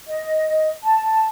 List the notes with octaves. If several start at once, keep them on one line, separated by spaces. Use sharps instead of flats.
D#5
A5